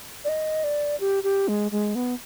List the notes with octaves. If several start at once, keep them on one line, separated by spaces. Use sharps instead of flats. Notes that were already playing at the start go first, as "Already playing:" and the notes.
D5
D#5
D5
G4
G4
G#3
G#3
B3